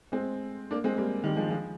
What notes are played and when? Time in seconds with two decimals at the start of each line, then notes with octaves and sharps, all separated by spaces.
0.12 G#3 C4
0.71 A#3 D4
0.84 G#3 C4
0.98 G3 A#3
1.24 D#3 G3
1.36 F3 G#3
1.49 F3 G#3